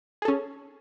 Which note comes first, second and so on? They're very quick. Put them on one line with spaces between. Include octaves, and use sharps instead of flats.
G#4 A4 C#4